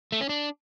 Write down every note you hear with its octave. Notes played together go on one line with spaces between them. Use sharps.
A3
C#4
D4